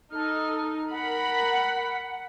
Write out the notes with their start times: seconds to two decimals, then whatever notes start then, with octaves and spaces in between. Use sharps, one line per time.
0.12 D#4 A4 F6
0.92 A#4 F#5 B5